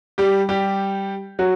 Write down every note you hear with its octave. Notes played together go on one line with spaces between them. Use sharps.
G3 G4
G3 G4
F#3 F#4